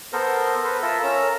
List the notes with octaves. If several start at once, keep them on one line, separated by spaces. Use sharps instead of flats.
B3 A4 A#4 C5
A4 B4 C5
F4 A4 A#4 E5
C#4 A#4 A#5 E6